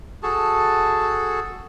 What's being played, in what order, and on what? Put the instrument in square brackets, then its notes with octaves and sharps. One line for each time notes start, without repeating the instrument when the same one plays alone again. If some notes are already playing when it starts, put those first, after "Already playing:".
[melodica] F#4 G#4 A4 A5